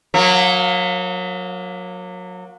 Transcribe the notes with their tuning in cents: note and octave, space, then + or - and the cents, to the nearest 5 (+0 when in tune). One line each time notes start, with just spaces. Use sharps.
F#3 -25 A#3 +5